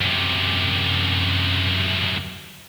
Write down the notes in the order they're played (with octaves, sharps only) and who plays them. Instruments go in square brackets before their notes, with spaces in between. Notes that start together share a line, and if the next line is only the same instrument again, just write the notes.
[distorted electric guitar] F#2 C3